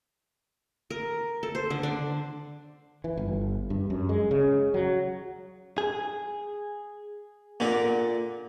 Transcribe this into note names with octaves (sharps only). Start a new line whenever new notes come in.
A#4
A4
C5
D3
D4
E3
G1
G2
F#2
G#3
C#3
F#3
G#4
A#2 D3